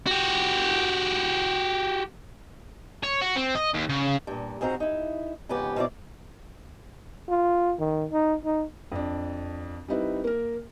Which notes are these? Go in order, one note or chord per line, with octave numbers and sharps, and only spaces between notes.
F#4 G4
C#5
F#4
C4
D#5
D#2
C#3
G2 A#2
G#2 G#3 C4 F#4 A#5
D#4 E4
F2 G#2 C#3 B3 G4
B2 F3 A3 C4 E4 D5
F4
D#3
D#4
D#4
F2 D4
G3 C4 D#4 E4 B4
A#3 A#4